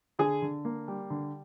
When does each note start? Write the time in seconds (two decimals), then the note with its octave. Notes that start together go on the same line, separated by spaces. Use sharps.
0.19 D3 G#4
0.42 D3
0.65 A#3
0.88 G3
1.10 D3